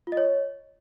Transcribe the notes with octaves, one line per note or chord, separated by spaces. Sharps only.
F4
D#5
C#5